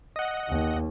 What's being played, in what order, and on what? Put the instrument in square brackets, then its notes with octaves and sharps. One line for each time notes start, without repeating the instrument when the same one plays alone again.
[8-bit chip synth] D#5 F#5
[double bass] D#2